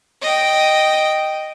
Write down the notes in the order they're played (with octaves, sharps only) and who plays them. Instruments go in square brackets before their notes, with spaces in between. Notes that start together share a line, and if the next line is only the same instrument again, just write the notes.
[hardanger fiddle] D#5 G5